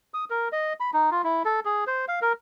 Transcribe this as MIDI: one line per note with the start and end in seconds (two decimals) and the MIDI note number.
0.14 0.25 87
0.30 0.48 70
0.52 0.73 75
0.80 0.91 83
0.93 1.10 63
1.11 1.22 65
1.24 1.43 64
1.45 1.60 69
1.65 1.84 68
1.87 2.05 72
2.08 2.20 77
2.22 2.33 70